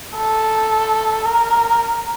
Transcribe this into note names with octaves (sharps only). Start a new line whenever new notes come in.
A4
A#4